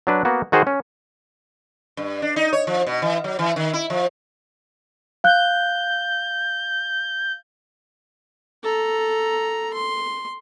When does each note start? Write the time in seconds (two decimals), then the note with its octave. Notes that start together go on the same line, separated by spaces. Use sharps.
0.07 F#3 D4 B4
0.25 A#3 B3 F#4
0.52 D#3 F#4 G#4 C5
0.67 C#4
1.97 G2
2.22 D4
2.36 D#4
2.53 C#5
2.67 F3
2.87 B2
3.02 E3
3.24 F#3
3.39 E3
3.56 D#3
3.73 E4
3.90 F3
5.24 F5 F#6 G6
8.64 A4 A#5
9.73 C6